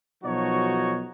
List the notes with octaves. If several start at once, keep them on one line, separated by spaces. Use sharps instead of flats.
B1 F3 D#4 F#4 C#5